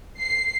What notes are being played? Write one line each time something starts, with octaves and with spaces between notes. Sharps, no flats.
C7